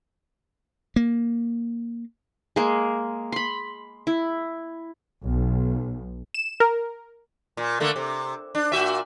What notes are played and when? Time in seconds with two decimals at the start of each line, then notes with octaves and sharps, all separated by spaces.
0.96 A#3
2.56 G#3 A#3
3.32 B5 C6
4.07 E4
5.22 B1
6.34 E7
6.60 A#4
7.57 A#2
7.80 D3 A3 A#3
7.96 C3
8.55 D4
8.72 A#2 F#4 E5